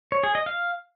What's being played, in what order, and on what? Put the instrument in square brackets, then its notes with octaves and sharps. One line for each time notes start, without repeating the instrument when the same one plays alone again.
[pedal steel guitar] C#5
G#4
D#5
F5